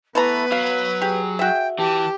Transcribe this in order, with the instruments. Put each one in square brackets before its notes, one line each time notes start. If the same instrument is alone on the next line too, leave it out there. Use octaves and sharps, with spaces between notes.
[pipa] E3 A3 A#5 [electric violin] B3 [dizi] B4
[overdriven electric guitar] F#3 [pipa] F5
[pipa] G4 [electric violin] G#4
[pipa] F#4 E5 [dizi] G5
[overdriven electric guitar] E3 [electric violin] G4 [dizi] A5